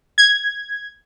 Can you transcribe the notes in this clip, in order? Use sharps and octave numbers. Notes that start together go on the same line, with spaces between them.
G#6